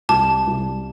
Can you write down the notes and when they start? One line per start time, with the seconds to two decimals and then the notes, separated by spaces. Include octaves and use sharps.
0.09 C2 A5
0.47 C2